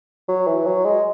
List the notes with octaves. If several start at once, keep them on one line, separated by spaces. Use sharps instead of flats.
F#3
E3
F#3
G#3